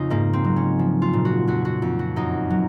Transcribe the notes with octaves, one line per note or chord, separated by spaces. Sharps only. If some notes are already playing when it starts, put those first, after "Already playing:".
Already playing: F2 C#3 D#4 F4
G#2 A#3
C4
F#3
C#4
F3
F4
A#2
F#4
F2 F#4
F#4
F2
F#4
F#2 D#4
F#3